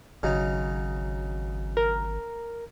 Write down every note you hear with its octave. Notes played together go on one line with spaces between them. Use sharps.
G#1 C#3 F#3 D#4
A#4